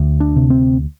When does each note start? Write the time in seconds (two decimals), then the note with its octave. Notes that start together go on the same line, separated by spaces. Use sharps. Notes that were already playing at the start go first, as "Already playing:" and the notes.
Already playing: D2
0.20 D4
0.36 C3
0.50 C4